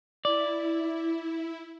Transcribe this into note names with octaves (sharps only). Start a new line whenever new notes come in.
E4 D5